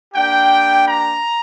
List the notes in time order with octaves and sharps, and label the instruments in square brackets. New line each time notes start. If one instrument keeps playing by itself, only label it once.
[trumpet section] A#3 D4 G4 G5
A#5